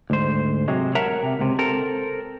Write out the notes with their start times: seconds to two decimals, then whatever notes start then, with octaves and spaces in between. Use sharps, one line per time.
0.10 D2 G#2 C5
0.68 C3 F#3 G#3
0.95 A#4 C#5 E5 F#5 A5 A#5
1.23 C3
1.39 C#2 C3
1.59 C4 A4 A#4